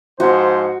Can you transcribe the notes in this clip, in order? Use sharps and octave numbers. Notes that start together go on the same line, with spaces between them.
G#2 F3 F#4 C5